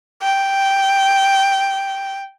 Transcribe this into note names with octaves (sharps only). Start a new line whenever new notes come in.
G5